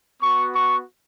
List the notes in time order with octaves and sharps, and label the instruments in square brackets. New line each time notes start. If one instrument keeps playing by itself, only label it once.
[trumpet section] B3 F#4 C#6
C#6